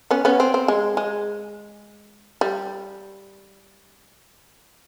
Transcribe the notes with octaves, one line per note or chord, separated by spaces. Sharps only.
B3 C#4
B3 C#4
C4
C4
G#3
G#3
G3